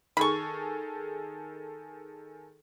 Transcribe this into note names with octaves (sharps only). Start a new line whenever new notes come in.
D#3 G#4 A4 B5 C#6